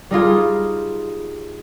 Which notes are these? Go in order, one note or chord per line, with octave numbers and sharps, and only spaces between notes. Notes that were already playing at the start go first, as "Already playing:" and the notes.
G3 D#4 F4 G#4